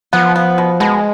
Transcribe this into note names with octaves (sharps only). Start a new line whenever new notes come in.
F3 B3
B3
B2
B2 G#3